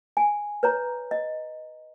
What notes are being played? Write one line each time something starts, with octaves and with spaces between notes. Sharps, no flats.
G#5
B4 C#5 A#5
D#5